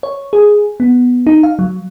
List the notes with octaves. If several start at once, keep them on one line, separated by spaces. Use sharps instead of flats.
C#5
G#4
B3
D#4
F5
F#3